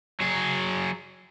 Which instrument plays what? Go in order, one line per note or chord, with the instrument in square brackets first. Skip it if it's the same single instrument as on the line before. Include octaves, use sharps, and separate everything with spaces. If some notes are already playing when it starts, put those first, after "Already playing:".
[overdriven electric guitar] F#3 G#4